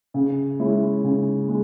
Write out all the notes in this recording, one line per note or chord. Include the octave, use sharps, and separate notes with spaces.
C#3
G#3 C#4 E4
C#3
G#3